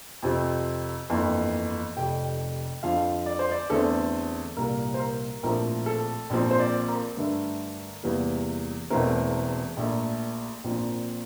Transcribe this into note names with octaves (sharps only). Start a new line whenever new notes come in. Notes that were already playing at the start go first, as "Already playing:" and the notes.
F2 C3 F3 C4
G1 F2 E3 A#3
F1 F2 C3 G5
F2 D3 F3 F5
D5
C5
D5
E2 D3 A3 C4 A4
C2 A#2 G3 A#3 A#4
C5
A#4
A#1 A2 F3 A3 C4 A#4
A4
A#1 A#2 F3 C4
C5
D5
A#4
G2 D3 A3
E2 C3 E3 G3 A#3
E1 E2 E3 A3 C4 A#4
A#1 A#2 A3
A#1 A#2 F3 C4